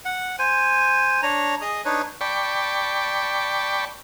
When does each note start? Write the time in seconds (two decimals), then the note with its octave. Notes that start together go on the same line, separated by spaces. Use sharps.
0.05 F#5
0.39 C5 G#5
1.22 D4 C#5 A#5
1.61 G#4 D#5 D#6
1.85 D4 D#4 B4 C#5
2.21 D5 G5 A5 B5 C#6